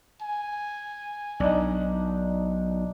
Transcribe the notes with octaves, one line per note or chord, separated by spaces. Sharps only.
G#5
B1 D4 D#4